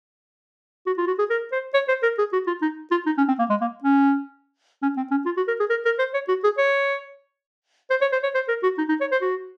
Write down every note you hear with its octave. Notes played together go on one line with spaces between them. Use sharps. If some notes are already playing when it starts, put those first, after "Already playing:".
F#4
F4
F#4
G#4
A#4
C5
C#5
C5
A#4
G#4
F#4
F4
D#4
F4
D#4
C#4
C4
A#3
G#3
A#3
C#4
C#4
C4
C#4
F4
F#4
A#4
G#4
A#4
A#4
C5
C#5
F#4
G#4
C#5
C5
C#5
C5
C#5
C5
A#4
F#4
D#4
D#4
C#5
C5
F#4